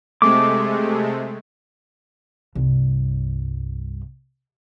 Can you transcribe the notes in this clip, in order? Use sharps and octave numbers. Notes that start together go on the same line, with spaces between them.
C3 G#3 A3 D6
C2 G2